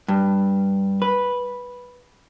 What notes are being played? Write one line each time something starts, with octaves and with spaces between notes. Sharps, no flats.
G2
B4